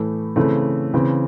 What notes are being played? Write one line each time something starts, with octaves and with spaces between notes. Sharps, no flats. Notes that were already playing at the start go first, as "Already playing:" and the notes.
Already playing: A2 E3 A3
C#3 E3 A3 C4
C#3 E3 C4